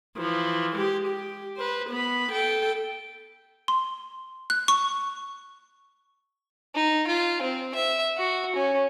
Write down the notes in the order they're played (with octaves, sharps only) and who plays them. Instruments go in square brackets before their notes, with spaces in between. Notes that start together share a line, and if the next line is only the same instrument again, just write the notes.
[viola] E3 F3
G#3 G4
G4
B4 C5
B3 B5
A4 G5
[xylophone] C6
F#6
C#6
[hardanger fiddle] D#4
F4
C4
E5
F#4
C#4